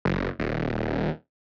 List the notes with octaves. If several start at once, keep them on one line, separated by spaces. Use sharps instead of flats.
F#1
D#1